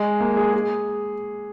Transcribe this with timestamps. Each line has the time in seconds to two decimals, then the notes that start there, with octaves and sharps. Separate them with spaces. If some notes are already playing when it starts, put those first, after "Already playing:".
Already playing: G#3
0.20 A#3
0.37 G#4
0.53 G#4